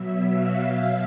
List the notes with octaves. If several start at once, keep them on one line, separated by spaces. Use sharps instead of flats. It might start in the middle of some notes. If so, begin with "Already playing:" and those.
Already playing: B2 F#3 E5
F5